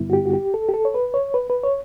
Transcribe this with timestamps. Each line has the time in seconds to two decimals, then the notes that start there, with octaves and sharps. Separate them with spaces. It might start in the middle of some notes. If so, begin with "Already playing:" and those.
Already playing: G2 D3 G3 B3 E4
0.10 F#4
0.13 G4
0.26 F#4
0.33 G4
0.54 A4
0.69 G4
0.74 A4
0.85 C#5
0.94 B4
1.14 C#5
1.34 B4
1.50 B4
1.64 C#5